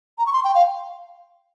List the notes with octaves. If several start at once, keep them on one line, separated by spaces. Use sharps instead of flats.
A#5
C#6
C6
G5
F5